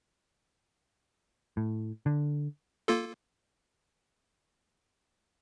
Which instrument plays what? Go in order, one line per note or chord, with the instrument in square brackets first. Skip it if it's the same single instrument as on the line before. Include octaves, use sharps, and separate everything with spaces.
[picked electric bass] A2
D3
[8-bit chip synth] A#3 F4 A4